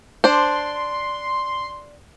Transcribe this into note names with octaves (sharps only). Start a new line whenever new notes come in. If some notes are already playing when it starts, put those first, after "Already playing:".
D4 C5 C6